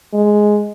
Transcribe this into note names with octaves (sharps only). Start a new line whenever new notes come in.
G#3